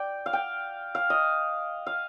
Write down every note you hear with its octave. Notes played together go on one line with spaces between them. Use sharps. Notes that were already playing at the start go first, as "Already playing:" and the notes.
Already playing: D5 G5
F5
G5
F5
D#5
F5